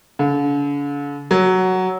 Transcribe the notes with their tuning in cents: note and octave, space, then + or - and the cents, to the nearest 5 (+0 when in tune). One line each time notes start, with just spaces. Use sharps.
D3 -45
F#3 +5